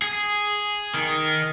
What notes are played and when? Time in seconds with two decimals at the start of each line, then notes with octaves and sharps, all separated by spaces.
0.02 G#4
0.94 D#3